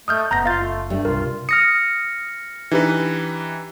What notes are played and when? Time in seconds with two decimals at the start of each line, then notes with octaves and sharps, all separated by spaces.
0.08 A3 D#5 D#6 F6 G6
0.31 F#1 B3 A#5 G6 A#6
0.46 F4 F5 A6
0.62 A3
0.90 G2 G3 A3
1.05 C2 C3 F4 A#4
1.49 D#6 F6 A#6 C#7
2.71 E3 D4 D#4 G4 B4